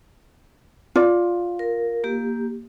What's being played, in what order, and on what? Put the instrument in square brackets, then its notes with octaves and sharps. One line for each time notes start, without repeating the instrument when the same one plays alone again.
[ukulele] F4 D5
[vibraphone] A#4
A#3 G4